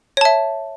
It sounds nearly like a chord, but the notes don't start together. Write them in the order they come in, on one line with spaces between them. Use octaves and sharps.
C#5 A5 E5